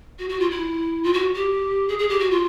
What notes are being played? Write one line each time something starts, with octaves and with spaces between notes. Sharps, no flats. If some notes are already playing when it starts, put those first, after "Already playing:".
F#4
F#4
F4
E4
F4
F#4
G4
G#4
G#4
G4
F#4
F4